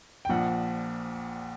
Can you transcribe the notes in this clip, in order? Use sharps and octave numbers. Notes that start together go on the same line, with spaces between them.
G5
A#1 A#2 F3 F#5